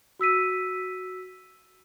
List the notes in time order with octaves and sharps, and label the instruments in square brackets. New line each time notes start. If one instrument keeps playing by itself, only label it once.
[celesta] F#4 E6 B6 D#7